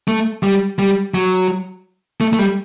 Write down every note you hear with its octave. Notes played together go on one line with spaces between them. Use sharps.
A3
G3
G3
F#3
A3
A3
G3